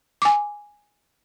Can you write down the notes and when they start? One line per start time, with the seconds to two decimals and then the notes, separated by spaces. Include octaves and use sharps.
0.22 G#5 D6